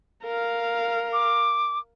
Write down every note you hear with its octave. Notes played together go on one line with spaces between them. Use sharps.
A#4 F5
D6